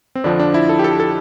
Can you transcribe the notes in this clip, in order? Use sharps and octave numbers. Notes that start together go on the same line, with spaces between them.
C4
F2 D3 F3 D4
D4
E4
A4
G4
A4
A4